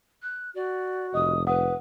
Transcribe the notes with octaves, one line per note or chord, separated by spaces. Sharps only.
F#6
F#4 D5
F1 D#5 D#6
B4 F#5 D#6